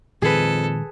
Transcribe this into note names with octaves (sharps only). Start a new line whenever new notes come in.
F2 A#2 D#3 G#3 G#4 A4 B4